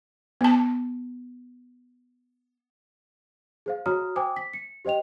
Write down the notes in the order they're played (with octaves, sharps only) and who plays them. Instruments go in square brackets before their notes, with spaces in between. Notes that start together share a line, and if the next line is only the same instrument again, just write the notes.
[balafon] B3 A5
[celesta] G#4 C5 F5
F#4 C#5 A#5 D#6 F6
C5 G5 G#5 D6 D#6
B6
C#7
G4 C5 D#5 G5 F7